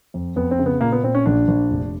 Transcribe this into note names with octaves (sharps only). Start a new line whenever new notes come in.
F2
F2 B3
C4
C#3
B3
A#2 A#3
B3
A#2 C4
C#4
A#1 D4
A#1
F1